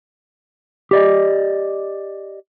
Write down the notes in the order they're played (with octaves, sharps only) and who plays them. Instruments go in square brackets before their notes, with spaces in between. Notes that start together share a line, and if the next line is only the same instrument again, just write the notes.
[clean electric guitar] G4 D5 D#5